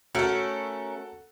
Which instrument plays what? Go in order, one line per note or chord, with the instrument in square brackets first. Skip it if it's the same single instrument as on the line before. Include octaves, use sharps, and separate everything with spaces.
[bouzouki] A3 C#4 A#4 [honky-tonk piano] F#4 A4